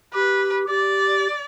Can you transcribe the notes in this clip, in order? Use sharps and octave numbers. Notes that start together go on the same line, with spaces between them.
G4 B4
G4 D5